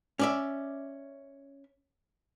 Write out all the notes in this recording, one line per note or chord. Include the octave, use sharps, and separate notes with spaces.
C#4 D5 E5